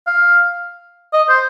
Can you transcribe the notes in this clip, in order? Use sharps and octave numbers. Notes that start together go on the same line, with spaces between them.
F5
D#5
C5